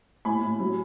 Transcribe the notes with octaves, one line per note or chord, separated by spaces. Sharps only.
A2 G#5 B5
A2
F#3